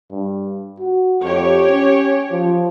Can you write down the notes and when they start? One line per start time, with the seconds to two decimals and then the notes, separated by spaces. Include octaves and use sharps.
0.11 G2
0.80 F#4
1.22 F2 G4 C#5
1.67 C#4
2.32 F3